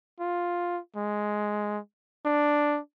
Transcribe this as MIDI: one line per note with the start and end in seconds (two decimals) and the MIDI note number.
0.20 0.79 65
0.96 1.79 56
2.25 2.79 62